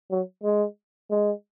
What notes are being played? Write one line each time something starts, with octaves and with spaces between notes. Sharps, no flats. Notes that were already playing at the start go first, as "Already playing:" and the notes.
F#3
G#3
G#3